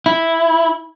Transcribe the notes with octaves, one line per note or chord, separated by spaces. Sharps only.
E4